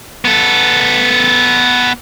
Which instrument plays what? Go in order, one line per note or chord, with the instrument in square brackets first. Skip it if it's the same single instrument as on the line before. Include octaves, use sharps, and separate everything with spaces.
[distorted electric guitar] B3 A4